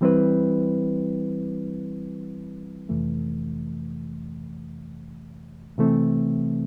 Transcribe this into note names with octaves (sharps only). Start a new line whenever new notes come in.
E3 G3 C4 E4 B4
F2 C3 E3 A3
C3 E3 A3 C4